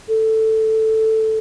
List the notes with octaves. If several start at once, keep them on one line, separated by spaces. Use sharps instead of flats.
A4